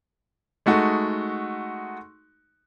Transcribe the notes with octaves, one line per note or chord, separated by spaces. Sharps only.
G#3 A3 D#4 F#4